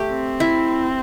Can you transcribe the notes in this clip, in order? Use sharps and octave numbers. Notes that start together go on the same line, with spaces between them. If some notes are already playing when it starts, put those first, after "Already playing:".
Already playing: A3 G4
C4
E4